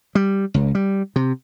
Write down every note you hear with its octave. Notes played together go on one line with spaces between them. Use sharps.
G3
C#2
G3
C3